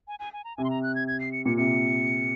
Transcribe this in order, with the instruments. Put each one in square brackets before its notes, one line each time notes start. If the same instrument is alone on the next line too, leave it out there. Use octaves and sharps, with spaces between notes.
[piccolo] G#5
G#5
G#5
A#5
[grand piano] C3 [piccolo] G#5
[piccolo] C6
A#5
F#6
G#6
G#6
C7
C#7
[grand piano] A#2 [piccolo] C#7
[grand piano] C3 [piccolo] C#7